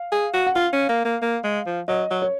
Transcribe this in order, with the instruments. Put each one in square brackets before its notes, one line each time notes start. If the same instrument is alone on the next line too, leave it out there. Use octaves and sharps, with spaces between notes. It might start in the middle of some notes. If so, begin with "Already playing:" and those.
Already playing: [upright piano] F5
[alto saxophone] G#4
F#4
[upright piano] F#5
[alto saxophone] F4 [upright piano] F5
[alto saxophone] C#4
A#3
A#3
A#3
G#3
F3
[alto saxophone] F#3 [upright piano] D#5
[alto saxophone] F#3
[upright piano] C#5